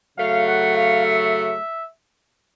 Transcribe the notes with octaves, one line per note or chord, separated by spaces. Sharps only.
C#3 F#3 A3 F5
F#5
F5
E5